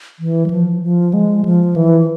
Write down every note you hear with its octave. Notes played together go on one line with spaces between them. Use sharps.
E3
G3
F3
F3
G#3
F3
E3